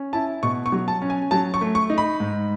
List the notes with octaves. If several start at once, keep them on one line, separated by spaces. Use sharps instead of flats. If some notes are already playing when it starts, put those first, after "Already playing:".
Already playing: C#4
E4 A5
B2 C#6
C#6
F#3
A5
C#4
G#5
F#3 A5
C#6
A3
C#6
D#4
B5
G#2